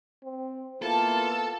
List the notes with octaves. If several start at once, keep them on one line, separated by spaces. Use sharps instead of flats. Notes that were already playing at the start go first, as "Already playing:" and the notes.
C4
A#3 B3 E4 F4 A4 A5